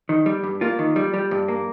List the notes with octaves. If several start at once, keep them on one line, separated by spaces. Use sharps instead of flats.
D#3
G3
G2
A#3 F4
D#3
G3
G3
G2
A#3